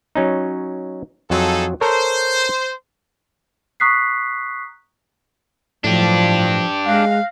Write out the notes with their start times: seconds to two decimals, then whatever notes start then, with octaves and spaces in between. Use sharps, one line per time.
0.15 F#3 C#4 D#4
1.30 F2 F#3 D#4 F4 G#4 A4
1.81 A4 A#4 C5 C#5
3.80 A#5 C#6 D#6 F#6 B6 C7
5.84 A2 F3 F#3 D4 G4
6.86 G#3 F5 F6 F#6 A#6